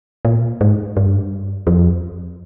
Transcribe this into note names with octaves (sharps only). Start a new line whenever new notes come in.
A#2
G#2
G2
F2